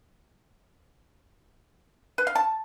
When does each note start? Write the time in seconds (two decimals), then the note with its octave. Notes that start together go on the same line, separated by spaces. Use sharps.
2.18 B4
2.27 F5
2.35 A5